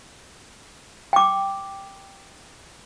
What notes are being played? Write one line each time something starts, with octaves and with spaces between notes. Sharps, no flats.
G5 D6